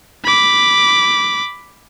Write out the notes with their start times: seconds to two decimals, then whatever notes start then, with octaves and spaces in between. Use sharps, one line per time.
0.24 B5 D6